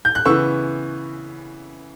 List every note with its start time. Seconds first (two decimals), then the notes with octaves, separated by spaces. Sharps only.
0.05 G6
0.15 F#6
0.25 C#3 E3 B3 C#6 E6